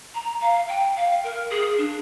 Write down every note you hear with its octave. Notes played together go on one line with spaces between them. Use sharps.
A#5
F5
G5
F5
A#4
G#4
D4